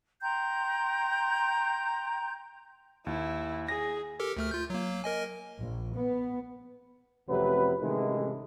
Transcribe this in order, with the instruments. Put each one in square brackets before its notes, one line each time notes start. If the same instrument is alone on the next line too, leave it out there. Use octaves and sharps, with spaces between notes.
[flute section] G5 A#5 C6 G6
[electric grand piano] D#2 [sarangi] E4
[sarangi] G#4 [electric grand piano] A#6
[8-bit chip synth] G4 A4 A#4
D2 A3 F6
F4 G6
F#3 A#3
A#4 D#5 G#5
[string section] A#1
B3
[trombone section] A1 F2 C3 F#3 B4
A1 C3 D#3 E3 G#3 A4